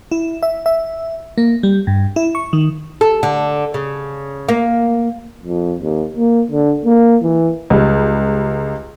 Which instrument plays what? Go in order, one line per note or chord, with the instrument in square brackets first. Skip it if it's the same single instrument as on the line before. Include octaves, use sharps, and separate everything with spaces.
[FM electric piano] E4
E5
E5
A#3
G3
G2
E4
C#6
D#3
[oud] A4
D3
C#3
A#3
[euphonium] F2
D#2
A#3
D3
A#3
E3
[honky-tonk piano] C#2 G3